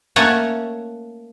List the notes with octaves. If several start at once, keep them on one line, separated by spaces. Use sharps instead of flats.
A3 A#3 C#4 A4 C#5 F#5